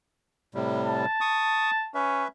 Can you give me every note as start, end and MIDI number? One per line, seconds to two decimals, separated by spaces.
0.54 1.06 45
0.54 1.06 48
0.54 1.06 55
0.86 1.89 81
1.21 1.71 85
1.21 1.71 87
1.95 2.24 61
1.95 2.28 71
1.95 2.28 76